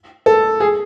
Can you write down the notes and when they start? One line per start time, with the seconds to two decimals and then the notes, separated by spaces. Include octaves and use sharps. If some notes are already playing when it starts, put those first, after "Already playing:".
0.26 A4
0.60 G#4